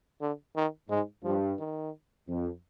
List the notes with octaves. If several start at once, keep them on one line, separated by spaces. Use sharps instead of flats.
D3
D#3
G#2 G#3
G2 F3
D#3
F2